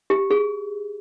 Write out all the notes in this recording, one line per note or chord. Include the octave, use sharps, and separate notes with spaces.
G4
G#4